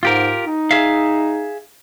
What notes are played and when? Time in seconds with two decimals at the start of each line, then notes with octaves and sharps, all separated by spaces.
0.03 G#2 F4 G4 A#4
0.44 D#4
0.71 G#4 E5 F5